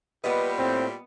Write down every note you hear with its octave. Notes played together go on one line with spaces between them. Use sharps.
A#2 G3 B3 G4 B4 D#5
A2 C4